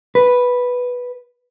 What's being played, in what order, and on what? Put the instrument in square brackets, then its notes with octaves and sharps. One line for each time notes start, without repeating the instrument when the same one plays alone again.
[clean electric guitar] B4